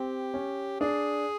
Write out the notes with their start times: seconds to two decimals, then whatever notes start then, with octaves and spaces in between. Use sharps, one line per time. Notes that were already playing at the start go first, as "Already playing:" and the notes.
Already playing: C4 G4
0.34 C#4
0.80 D4 G#4